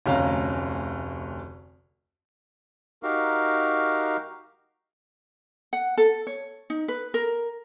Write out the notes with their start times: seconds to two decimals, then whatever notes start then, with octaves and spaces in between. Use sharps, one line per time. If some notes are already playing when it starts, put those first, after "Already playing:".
0.06 F1 D2 C#4 F5 A#5
3.03 D#4 F#4 G4 A#4 F5
5.73 F#5
5.98 A4
6.27 C#5
6.70 D#4
6.88 B4
7.14 A#4